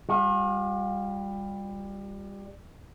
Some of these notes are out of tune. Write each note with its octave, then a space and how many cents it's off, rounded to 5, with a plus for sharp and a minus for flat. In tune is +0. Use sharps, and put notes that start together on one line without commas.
G3 +20 F4 +45